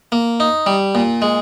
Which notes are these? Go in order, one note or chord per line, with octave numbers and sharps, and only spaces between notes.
A#3
D#4
G3
A#2
G#3